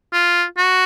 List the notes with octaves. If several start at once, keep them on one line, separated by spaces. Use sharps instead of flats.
F4
F#4